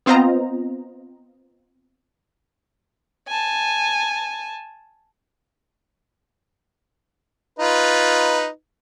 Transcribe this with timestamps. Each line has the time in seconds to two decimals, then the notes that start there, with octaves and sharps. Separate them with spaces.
0.06 B3 C4 F4 C5 D#5 A#5
3.28 G#5 A5
7.59 D#4 F4 B4